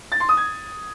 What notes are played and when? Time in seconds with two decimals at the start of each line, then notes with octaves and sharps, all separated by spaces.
0.12 A6
0.20 C6
0.29 D#6
0.37 G#6